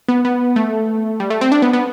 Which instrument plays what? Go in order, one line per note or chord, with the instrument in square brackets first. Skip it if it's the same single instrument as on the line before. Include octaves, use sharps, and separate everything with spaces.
[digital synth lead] B3
B3
A3
G3
A3
C4
D4
B3
B3